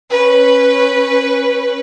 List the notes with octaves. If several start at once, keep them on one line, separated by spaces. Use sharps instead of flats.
C#4 B4